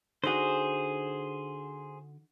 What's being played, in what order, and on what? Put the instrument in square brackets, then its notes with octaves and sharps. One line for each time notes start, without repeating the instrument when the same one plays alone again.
[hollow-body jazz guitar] D3 D#4 F#4 [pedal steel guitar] G#4 C5